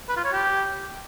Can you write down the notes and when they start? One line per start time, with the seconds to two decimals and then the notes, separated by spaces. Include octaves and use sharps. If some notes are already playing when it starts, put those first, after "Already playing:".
0.09 B4
0.17 F4
0.24 C#5
0.32 G4